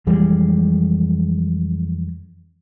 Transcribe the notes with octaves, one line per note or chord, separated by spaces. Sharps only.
F2 E3 G3 G#3